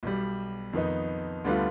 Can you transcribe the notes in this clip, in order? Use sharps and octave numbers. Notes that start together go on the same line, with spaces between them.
B1 B2 G3
F2 D#3 B3 D#4
D2 D3 G3 B3 F4